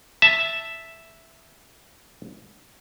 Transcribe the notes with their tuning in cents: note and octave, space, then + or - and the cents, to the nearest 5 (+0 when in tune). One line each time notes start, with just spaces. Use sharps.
E5 +0 A5 +0